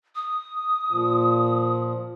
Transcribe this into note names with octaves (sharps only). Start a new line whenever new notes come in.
D#6
A#2 F3